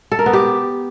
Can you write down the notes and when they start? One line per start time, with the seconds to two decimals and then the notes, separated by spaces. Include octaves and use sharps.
0.12 A4
0.19 A#4
0.26 B3
0.33 G4